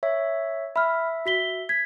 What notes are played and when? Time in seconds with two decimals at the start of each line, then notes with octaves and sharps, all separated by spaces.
0.03 C#5 E5
0.76 E5 B5 F6
1.26 F#4 B6 G7
1.69 G#6 B6